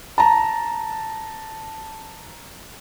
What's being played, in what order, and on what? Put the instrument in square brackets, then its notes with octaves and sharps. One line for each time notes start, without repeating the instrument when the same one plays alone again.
[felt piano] A5 A#5